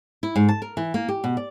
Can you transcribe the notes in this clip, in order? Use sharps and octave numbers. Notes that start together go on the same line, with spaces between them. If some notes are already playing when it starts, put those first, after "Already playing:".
E4
G#2
A5
A#4
E3
A#3
G4
B2
D5